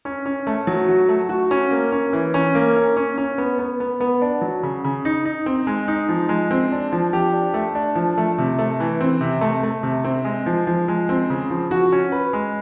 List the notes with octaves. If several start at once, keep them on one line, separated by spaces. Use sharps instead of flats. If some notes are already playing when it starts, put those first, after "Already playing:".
C#4
C#4
A3
F#3
F#4
A3
F#4
C#4
A#3
C#4
E3
C#4
A#3
C#4
C#4
C#4
B3
B3
B3
B3
D4
F#3
C#3
C#3
D#4
D#4
C4
G#3
D#4
F3
G#3
C4
D4
F3
G4
D4
A3
D4
F3
A3
C3
A3
E3
C4
C3
A3
A3
C3
C4
G#3
F3
F3
G#3
C4
C#3
F3
F#4
C#4
B4
G#3